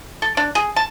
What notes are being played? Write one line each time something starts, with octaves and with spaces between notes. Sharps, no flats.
A4
D4
G#4
A5